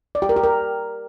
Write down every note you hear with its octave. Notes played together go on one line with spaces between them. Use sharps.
D5
G4
A#4
G4
A#4